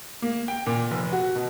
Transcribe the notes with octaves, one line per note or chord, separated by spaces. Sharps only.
A#3
G5
A#2
F1
F#4
B2